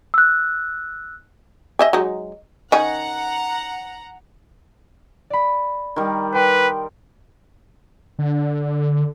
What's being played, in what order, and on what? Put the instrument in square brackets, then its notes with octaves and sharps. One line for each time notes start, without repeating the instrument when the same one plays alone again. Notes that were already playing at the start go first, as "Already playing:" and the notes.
[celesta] E6 F#6
[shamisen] D#5 E5 G#5
F#3 G#3 D#4
[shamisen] D#3 C#4 [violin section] F#5 A#5
[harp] D5 B5
[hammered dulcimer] D#3 G3
[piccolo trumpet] B4 [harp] G5 C6
[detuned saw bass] D3